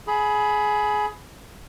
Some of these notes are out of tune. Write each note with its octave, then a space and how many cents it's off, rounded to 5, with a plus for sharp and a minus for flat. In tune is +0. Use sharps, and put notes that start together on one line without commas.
G#4 +20 B5 +0